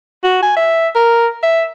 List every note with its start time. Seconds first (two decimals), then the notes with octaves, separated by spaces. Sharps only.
0.23 F#4
0.42 G#5
0.56 E5
0.95 A#4
1.43 E5